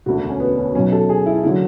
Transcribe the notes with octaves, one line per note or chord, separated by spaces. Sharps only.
E1 D2 D3 F#4
C#4
B3
C#4
B1 B2 F#3 C#4
A4
G#4
E4
D3 F#3 E4